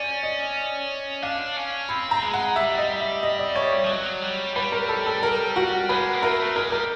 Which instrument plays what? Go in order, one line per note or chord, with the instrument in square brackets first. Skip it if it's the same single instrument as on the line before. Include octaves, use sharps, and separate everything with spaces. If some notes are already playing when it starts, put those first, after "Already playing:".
Already playing: [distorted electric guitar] C#4 [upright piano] D5
[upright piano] D#5
[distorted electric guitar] D4 [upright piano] F5
[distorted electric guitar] C#4
[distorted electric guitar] C4 [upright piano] B5
[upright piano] A#5
[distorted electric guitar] G#3
[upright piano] F#5
[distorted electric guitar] G3 [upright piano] E5
[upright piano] D#5
E5
D#5
D5
C#5
C#5
[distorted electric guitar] F3
F#3
G3
[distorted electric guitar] G3 [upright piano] B4
[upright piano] A#4
A4
A4
A#4
F#4
[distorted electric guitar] G#3 [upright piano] B4
[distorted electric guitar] A#3
[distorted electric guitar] A3 [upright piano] A#4
[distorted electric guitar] G#3 [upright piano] A#4
[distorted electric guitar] G3 [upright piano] A#4